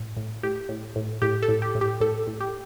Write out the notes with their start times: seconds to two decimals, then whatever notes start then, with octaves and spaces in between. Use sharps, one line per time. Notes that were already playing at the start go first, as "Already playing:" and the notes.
Already playing: A2
0.17 A2
0.43 A2 G4
0.69 A2
0.96 A2
1.22 A2 G4
1.42 A4
1.48 A2
1.62 G4
1.75 A2
1.81 G4
2.00 A2 A4
2.27 A2
2.41 G4